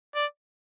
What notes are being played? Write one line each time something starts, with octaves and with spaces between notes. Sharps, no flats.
D5